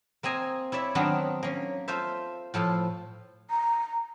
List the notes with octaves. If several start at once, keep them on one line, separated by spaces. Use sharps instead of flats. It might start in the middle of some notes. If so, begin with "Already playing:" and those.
A#3 C4 D#5 G#5 A#5
E4 C#5 D5 E5
D#3 F#3 B3 C4 D4 A#4
A#3 C#4
F4 A4 C5 E5
A2 F3 A4 C6
A#5